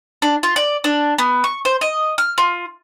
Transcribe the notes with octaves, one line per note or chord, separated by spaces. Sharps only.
D4
F4
D5
D4
B3
C#6
C5
D#5
F6
F4